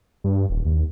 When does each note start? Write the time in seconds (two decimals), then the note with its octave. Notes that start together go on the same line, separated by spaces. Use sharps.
0.24 G2
0.50 D#1
0.65 D#2